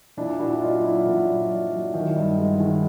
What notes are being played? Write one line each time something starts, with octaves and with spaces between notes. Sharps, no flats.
A#2 D4 E4
A#2 E4 F#4
F#3 D#4 F4
F#3 E4 F#4
A#2 E4 F#4
F#3
F#3
F#3
D#3
G2
G#3
D#3